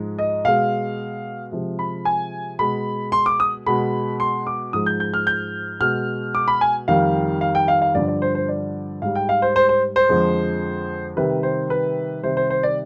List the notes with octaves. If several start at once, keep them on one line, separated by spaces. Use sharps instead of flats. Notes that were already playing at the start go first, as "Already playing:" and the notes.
Already playing: G#2 F3 G#3
D#5
B2 G#3 F5
C3 F3 G#3
B5
G#5
B2 G#3 B5
C6
D6
D#6
B2 G#3 B5
C6
D6
G#2 F3 G#3 D#6
G6
G6
F6
G6
B2 G#3 F6
D6
B5
G#5
F2 D#3 G3 F5
F5
G5
F5
F5
G2 D3 F3 D5
D5
C5
C5
D5
G#2 G3 F5
G5
F5
C5
C5
C5
C5
F2 D3 F3 G#3
C3 D#3 G3 B4
C5
B4
C3 D#3 G3 C5
C5
C5
D5